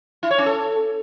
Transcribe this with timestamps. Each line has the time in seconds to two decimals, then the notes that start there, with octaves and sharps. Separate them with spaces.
0.23 E4
0.31 C#5
0.38 C#4
0.46 A4